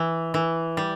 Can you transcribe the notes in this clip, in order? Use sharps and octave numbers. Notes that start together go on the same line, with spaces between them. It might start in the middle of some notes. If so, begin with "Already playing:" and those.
Already playing: E3
E3
G3